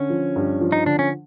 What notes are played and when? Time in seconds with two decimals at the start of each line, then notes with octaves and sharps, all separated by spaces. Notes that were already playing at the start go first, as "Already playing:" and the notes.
Already playing: D3 C#4
0.10 F3
0.36 G2
0.61 F3
0.72 D#4
0.86 D3 D4
0.99 C#4